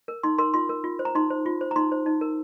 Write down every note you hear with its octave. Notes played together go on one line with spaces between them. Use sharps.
A#4
D#4 C6
A#4 C6
F4 C6
A#4
F4
C5
A#5
D#4 C6
C5
F4
C5
A#5
D#4 C6
C5
D#4
A#4